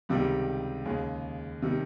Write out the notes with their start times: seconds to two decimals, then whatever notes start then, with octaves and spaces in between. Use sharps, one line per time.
0.09 C#2 C3 D#3 G3
0.85 D#2 C#3 G#3
1.62 C3 D#3 G3